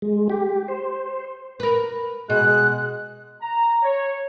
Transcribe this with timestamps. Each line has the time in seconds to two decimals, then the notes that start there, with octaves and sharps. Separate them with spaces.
0.02 G#3
0.30 G4
0.68 C5
1.60 A#4 B4
2.30 B2 G#3 F#6
3.42 A#5
3.83 C#5